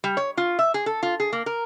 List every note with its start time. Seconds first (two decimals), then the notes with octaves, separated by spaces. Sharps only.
0.04 G3
0.17 C#5
0.37 F4
0.59 E5
0.74 G#4
0.86 A4
1.03 F4
1.20 G#4
1.33 A#3
1.46 A#4